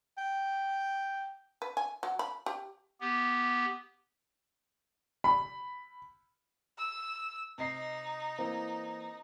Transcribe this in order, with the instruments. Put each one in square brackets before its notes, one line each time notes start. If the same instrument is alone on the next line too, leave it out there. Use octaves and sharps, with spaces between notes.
[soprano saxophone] G5
[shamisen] B4
G#5
F#3
B5
G4
[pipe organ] B3 G4
[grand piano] B5
[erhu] E6
[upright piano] C3 D#5 C7 [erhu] D#4
[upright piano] E3 A#3 C4